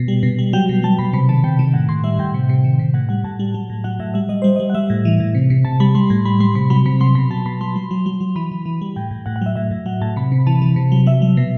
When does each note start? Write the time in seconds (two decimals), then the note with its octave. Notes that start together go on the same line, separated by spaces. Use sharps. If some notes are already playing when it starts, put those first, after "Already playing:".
Already playing: B2
0.08 G3
0.23 B2
0.39 G3
0.53 F#3 G5
0.69 B2
0.83 F#3 A5
0.99 B2 B5
1.13 C3 B5
1.29 D#3 A5
1.44 C3 G5
1.59 D#3
1.74 A2 F#5
1.88 A2 C6
2.04 G3 E5
2.19 A2 G5
2.34 C3
2.49 C3
2.64 D#3
2.79 C3
2.94 A2 F#5
3.09 G3 F#5
3.24 A2 A5
3.39 G3
3.54 F#3
3.70 A2
3.84 F#3 F#5
3.99 A2 E5
4.14 G3 E5
4.29 G3 D#5
4.42 G3 C5
4.56 G3 D#5
4.70 F#5
4.75 G3 E5
4.90 A2
5.05 E3
5.20 A2
5.35 C3
5.50 C3
5.65 C3 A5
5.80 G3 B5
5.95 G3 C6
6.10 A2
6.25 G3 B5
6.40 G3 C6
6.55 C3 B5
6.70 F#3 B5
6.86 C3 B5
7.00 F#3 C6
7.15 B2 B5
7.31 F#3 A5
7.46 B2 B5
7.61 F#3 C6
7.76 F#3
7.91 F#3
8.06 F#3
8.21 F#3
8.36 E3 B5
8.51 E3
8.66 E3
8.82 G3
8.96 A2 G5
9.11 A2
9.26 A2 F#5
9.36 F#5
9.42 F#3 E5
9.56 A2 E5
9.71 A2
9.86 F#3 F#5
10.01 A2 A5
10.16 C3 B5
10.32 C3
10.47 E3 A5
10.62 E3
10.76 C3
10.92 F#3
11.07 F#3 E5
11.22 F#3
11.37 B2